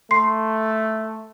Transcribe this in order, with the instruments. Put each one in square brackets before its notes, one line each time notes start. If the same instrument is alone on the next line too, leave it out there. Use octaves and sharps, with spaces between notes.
[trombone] A3 [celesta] C6 C7